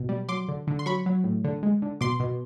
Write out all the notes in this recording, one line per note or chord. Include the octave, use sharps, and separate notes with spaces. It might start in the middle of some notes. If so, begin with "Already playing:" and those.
Already playing: B2
G3
F#3 C6 D6
D3
D3
C6
F#3 B5 C#6
F#3
A2
D3
G#3
D3
B2 C6 D6
B2